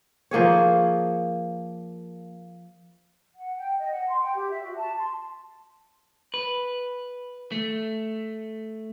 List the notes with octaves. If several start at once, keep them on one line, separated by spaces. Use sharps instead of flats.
F3 A#3 G#4 C#5
F#5
G5
D#5
F#5
C6
G5
G4
E5
F#4
A5
C6
B4
A3